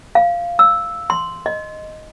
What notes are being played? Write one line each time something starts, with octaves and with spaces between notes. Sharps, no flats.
F5
E6
C6
D#5